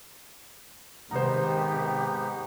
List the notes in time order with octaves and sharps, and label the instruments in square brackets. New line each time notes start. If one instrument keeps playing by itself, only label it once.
[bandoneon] G#2 B3 D#4 [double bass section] C3 D#3 [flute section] G4 [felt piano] C5 A#5